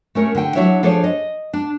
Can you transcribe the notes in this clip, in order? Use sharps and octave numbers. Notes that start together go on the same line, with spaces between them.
A3 C#4 A#4
D3 G5
F#3 D4 E4 C#5 E5
F3 D4 G#4 A4 C#5 D5
D#5
D4